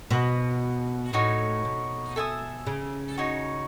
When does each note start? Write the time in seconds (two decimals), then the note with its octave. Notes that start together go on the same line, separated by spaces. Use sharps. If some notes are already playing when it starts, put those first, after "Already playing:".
0.11 B2 F#4 B4 D#5
1.13 A2 D#4 F#4 C#5
1.65 B2
2.16 A4 E5 G#5 D#6
2.67 C#3
3.18 D#4 F#4 C#5